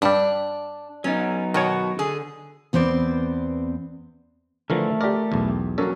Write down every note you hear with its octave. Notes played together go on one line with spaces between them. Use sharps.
G2 G3 D4
F#3 B3 C#4 D#4
B2 D#3 F#4 C#5
D3 G#4
E2 B3 C4 C5 D5
D3 E3 F3 A3 A#4
G4 A#4 D5
B1 E2
F#3 A#3 C#4 A4 A#4